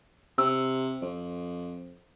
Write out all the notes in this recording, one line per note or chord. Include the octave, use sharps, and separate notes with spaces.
C3 E6
F2